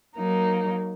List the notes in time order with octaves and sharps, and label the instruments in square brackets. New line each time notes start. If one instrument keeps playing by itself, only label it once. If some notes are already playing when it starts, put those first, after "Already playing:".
[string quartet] F#3 A#3 D#4